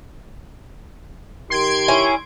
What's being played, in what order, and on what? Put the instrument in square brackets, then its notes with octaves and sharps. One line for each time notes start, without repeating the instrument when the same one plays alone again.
[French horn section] D#3 G4 A#4 [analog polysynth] C6 G#6 D7
[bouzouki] C#4 E4